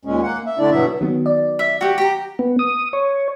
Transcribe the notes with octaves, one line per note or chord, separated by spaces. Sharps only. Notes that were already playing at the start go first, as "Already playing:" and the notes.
D#2 A#2 G#3 C#4
A#3 F#5
E5
D3 A3 D4 E4 D5
G2 B2 F#3 B3 E4 E5
D#3 F#3 B3
D5
E5
F#4 G4
G4 A#5
B3
D#6
C#5